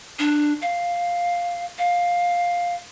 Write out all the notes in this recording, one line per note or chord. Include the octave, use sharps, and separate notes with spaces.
D4
F5
F5